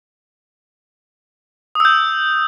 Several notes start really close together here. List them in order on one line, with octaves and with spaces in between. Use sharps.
D#6 E6 G6